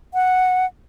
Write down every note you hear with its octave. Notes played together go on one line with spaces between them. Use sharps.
F#5